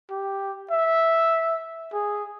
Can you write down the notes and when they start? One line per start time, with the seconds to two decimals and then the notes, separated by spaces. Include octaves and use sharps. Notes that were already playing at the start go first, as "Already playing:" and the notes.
0.10 G4
0.71 E5
1.93 G#4